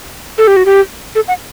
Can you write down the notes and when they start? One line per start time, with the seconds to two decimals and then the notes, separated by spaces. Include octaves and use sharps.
0.38 A4
0.47 G4
0.56 F#4
0.65 G4
1.15 A4
1.28 F#5